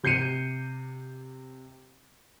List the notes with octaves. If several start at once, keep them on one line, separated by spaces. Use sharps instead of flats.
C3 G6 C7 C#7 D#7